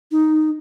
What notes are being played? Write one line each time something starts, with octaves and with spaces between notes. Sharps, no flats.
D#4